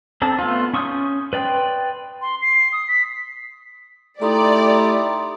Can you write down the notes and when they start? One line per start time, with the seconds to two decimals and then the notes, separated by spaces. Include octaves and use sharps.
0.22 C4 D4 A4
0.39 A3 B3 D4 F4
0.74 C#4 C#6 D#6 E6 G6
1.33 B4 D5 G5 C6
2.22 C6
2.42 C7
2.73 D#6
2.88 B6
4.22 A3 D#4 E4 G4 D5 A#5 C6 D#6